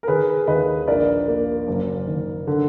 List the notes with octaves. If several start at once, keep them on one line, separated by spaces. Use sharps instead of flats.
A#4
D#3 G#4 B4
D#2 B4 D#5
A#1 A#4 D5
A#3
F#1
D#3
D3